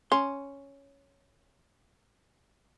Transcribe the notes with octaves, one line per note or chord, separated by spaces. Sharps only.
C#4 C6